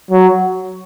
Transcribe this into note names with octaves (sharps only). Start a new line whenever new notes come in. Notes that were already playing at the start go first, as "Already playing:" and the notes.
F#3